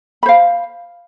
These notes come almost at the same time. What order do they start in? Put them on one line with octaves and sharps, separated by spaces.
B5 C5 F5